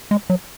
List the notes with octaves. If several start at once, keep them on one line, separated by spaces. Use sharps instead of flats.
G#3
F#3